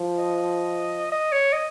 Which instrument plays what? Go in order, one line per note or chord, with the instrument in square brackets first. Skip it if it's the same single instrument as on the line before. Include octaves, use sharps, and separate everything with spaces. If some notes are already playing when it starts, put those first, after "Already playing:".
Already playing: [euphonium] F3
[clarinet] D#5
D#5
C#5
D#5